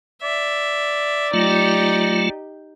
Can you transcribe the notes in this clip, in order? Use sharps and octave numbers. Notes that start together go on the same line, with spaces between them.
D5 E5
F#3 A3 D#4 F4 G4